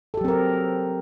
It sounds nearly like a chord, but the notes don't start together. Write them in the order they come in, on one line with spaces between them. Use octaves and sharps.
A4 G4 F#3 C4 A#4